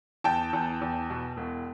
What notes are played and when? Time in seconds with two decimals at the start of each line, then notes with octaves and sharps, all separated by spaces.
0.24 E2 G5 A5
0.53 E2
0.81 E2
1.10 B2
1.37 E1